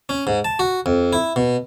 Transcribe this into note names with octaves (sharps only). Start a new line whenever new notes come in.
C#4
G#2
A5
F#4
F2
E4
B2